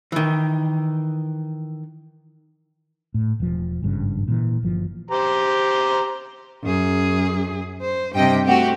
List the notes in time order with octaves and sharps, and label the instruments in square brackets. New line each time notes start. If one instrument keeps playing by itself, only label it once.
[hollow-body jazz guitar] D#3 E3
[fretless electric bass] A2
E1 F3
G#1 G2 C#3
A#2 E3
G1 F3
[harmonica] G4 C5 A#5
[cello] F#2 G#4
C5
[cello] G2 G3 [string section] C3 D#5 G5
[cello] A3 C4 [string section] F#4 G4